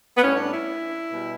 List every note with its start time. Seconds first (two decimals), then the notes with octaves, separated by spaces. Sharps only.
0.17 B3
0.22 A2 G3 C#4
0.37 D4
0.52 E4
1.11 B2 G3